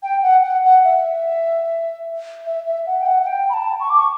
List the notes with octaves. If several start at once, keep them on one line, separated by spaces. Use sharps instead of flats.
G5
F#5
F#5
F#5
E5
E5
E5
F#5
G5
F#5
F#5
G5
B5
A5
C#6
D6
C#6